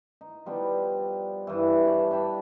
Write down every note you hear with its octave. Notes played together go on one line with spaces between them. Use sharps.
D#4
F3 G3 B3 D4
G2 E3
C#5 D5 A5
D4 B4 G5 A5